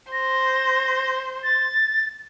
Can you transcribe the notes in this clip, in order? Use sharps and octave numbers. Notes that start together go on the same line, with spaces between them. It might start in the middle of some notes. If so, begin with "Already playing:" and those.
C5 A#6
A6